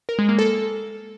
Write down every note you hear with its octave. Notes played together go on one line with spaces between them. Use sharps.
A#4
G#3
A#3
A4